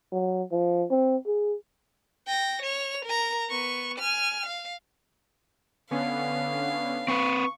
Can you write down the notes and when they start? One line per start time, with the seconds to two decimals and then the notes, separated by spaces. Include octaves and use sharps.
0.12 F#3
0.51 F3
0.90 C4
1.27 G#4
2.27 G5 A#6
2.62 C#5 F7
3.05 A#4 A#5
3.50 B3 C#6
3.99 G#5 F6
4.46 F5
5.91 D3 B3 C#4 F5
7.08 C4 B4 C#6